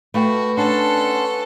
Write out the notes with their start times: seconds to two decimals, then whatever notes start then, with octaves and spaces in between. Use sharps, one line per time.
0.14 A3 F#4 B4 F5 G5
0.57 C#4 D4 A4 F#5 C6